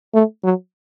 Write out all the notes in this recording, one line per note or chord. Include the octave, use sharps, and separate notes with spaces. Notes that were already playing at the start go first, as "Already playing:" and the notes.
A3
F#3